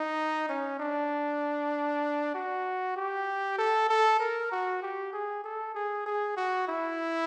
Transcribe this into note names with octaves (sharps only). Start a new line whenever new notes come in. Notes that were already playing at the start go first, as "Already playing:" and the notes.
Already playing: D#4
C#4
D4
F#4
G4
A4
A4
A#4
F#4
G4
G#4
A4
G#4
G#4
F#4
E4